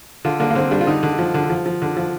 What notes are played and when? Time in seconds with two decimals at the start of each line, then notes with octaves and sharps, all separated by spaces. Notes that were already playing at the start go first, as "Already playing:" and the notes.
0.25 D3 F4
0.40 D3 A#3
0.51 A#3
0.55 D3 C4
0.71 G3 D4
0.81 F4
0.87 D3 D#4
1.03 D3
1.19 F3
1.34 D3
1.50 F3
1.66 F3
1.82 D3
1.97 F3